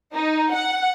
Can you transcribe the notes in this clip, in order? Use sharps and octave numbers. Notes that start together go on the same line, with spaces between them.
D#4
F#5